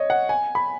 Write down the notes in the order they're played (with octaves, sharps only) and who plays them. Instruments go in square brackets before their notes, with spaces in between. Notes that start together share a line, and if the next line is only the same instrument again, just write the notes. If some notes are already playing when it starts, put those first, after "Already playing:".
Already playing: [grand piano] C#5 D#5
F#5
G#5
B5